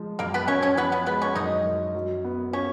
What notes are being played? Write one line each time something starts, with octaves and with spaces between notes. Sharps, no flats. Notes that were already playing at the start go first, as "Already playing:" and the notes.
Already playing: F3 G#3
F#2 A#3 A#4
B3 B4
F#2 C#4 C#5
C#4 C#5
F3 B3 B4
B3 B4
G#3 B3 B4
C#4 C#5
F#2 D#4 D#5
F#2
F#3
B3
C#4 F4 C#5